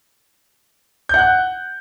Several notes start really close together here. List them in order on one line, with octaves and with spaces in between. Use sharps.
G6 F#5 F#6